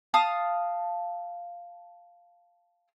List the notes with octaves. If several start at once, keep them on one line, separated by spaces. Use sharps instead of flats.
F5 A5 D#6 F6